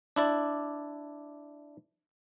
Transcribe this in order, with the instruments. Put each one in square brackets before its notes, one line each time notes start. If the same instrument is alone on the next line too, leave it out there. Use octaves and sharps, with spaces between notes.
[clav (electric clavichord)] D4 E4 D5